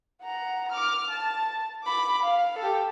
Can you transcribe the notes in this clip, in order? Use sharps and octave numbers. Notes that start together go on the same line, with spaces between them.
F#5 A#5
D6 F6
A5
B5 D6
F5
G4 A4